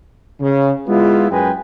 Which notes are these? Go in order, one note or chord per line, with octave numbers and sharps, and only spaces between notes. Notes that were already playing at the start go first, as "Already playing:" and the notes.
C#3
G#3 B3 E4 F4
F#2 G#3 B4 G5 G#5